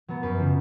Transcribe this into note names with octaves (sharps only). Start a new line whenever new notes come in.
F#3 B3
F#2 B4
C#3 F3